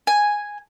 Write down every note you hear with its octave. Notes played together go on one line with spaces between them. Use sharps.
G#5